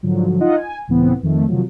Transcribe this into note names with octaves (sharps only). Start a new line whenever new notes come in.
G#2 D3 F3 F#3
D#4 F4 D#5 F#5
G#5
C#2 A2 E3 B3 C4
F2 D#3 A3
C3 D#3 F3 F#3